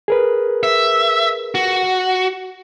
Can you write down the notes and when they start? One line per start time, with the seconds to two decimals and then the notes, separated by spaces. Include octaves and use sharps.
0.08 G#4 A#4 B4
0.63 E5
1.55 F#4